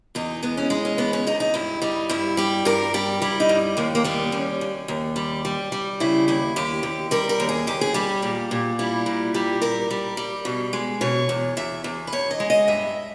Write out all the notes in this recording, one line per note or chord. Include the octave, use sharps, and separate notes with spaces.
E2 D#4
G#3 B3
C#4
G#3 D#4
C#4
E2 B3
C#4
E2 D#4
D#4
G2 E4
G3 D#4
G2 E4
G3 G4
G2 A#4
G3 G4
G3 E4
D#4
G2
D#2 A#3
A#3
G3 B3
D#2 C#4
D#2
D#2
G3
G3
G3
C#3 E4
D#2 E4
D#2 G4
D#2
G3 A#4
A#4
D#2
G#4
D#2 G4
G#4
G3 G4
A#2
A#2
G3 E4
A#2
G3 G4
A#2 A#4
G3
G3
B2
G#3
B2 C#5
E2
E2 E5
E2
B4
E2 C#5
D#5
G#3
D#5
G2 E5